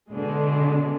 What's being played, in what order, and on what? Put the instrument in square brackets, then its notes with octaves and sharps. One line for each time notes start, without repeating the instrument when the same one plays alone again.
[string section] B2 D3 G#3